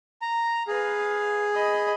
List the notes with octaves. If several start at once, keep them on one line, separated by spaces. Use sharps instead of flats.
A#5
G#4 B4 F5
D#5 B5